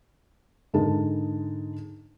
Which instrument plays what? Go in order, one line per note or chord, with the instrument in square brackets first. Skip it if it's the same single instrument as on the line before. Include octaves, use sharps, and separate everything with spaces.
[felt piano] G#2 D3 G#3 G#4 A#4 A5